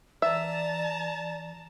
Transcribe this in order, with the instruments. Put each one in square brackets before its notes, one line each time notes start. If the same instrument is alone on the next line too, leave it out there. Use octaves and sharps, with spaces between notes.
[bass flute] E3 [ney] D5 [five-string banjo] E5 [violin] A5 A#5